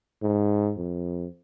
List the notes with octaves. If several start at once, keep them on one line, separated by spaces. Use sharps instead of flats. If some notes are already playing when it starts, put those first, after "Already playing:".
G#2
F2